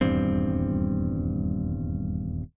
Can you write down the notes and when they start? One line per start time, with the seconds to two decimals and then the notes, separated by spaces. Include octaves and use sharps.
0.01 D#1 E2 G2 C4